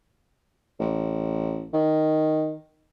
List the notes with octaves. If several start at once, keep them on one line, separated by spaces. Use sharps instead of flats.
A1
D#3